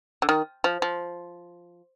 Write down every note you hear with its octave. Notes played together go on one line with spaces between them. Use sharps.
D3
D#3
F3
F3